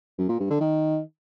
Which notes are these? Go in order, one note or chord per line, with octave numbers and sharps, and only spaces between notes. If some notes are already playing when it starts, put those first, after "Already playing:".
F#2
A#2
G2
D3
D#3